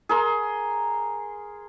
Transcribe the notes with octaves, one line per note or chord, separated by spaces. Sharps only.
G#4 A#4 C6